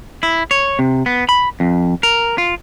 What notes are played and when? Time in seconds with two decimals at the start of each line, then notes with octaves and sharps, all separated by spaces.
0.23 E4
0.51 C#5
0.79 C3
1.06 B3
1.29 B5
1.60 F2
2.03 A#4
2.38 F4